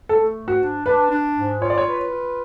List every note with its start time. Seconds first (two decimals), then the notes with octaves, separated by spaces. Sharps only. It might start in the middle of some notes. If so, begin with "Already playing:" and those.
0.09 A3 A4
0.35 G#2
0.48 F#4
0.60 D4
0.86 D4 B4
1.11 D4
1.35 G#2
1.62 F4 C#5
1.70 D5
1.78 C#5
1.86 B4
2.12 F4